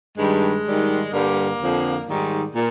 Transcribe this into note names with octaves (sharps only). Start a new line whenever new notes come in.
G2 D#3 G3 G#3
G#2 D#3 G3
G2 D3 G3 A#3
F2 D3 F3
G#2 D#3 G3
A#2